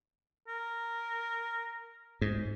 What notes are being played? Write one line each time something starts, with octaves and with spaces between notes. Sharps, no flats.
A#4
G#2